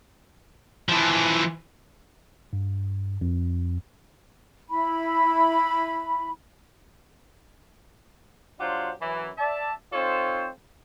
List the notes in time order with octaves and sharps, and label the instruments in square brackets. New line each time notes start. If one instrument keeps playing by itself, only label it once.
[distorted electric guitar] E3 F3
[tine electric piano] G2
F2
[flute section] E4 B5
[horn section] F#3 D4 F4 G4 C5 F#5
F#2 E3
D5 E5 A5
C4 D#4 F4 A4 C5 C#5